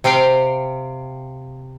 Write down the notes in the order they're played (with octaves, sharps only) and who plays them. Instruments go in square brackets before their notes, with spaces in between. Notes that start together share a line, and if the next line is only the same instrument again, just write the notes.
[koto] C3 C4 F5 G5